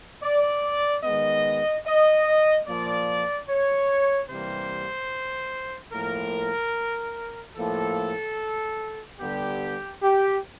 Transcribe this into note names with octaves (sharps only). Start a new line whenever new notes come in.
D5
D#3 G#3 B3 D#5
D#5
A#2 F3 A#3 D5
C#5
C3 E3 G3 A#3 C5
A2 F3 A#3 A#4
A2 F3 A#3 A4
D3 G3 B3 G4
G4